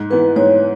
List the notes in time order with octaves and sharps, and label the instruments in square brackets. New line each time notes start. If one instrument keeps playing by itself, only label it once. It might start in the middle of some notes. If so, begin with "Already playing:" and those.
Already playing: [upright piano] G#2
[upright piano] E3 B3 [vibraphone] B4
[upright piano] G#2 [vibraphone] C#5